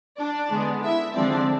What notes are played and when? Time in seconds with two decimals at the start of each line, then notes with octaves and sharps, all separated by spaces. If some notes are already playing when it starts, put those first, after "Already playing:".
0.17 D4 D5
0.49 D3 G#3 B3 D4
0.82 E4 E5
1.15 D3 F3 G#3 C4 D4 D5